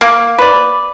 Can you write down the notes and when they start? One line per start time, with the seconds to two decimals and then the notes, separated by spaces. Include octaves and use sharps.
0.01 A#3
0.38 B4 D5